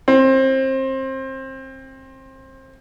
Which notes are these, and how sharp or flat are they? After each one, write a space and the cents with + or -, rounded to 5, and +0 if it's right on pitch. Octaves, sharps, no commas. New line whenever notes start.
C4 +25